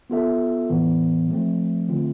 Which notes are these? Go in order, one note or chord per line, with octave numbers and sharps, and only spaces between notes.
B3 F4 A4 E5
A2 E3 B3
F3 A3 C4
D3 A3 C4 F4